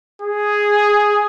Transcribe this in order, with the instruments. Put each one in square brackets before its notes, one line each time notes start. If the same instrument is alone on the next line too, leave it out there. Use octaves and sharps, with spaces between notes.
[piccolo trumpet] G#4